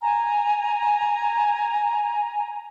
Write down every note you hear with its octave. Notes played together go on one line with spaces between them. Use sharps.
G#5 A#5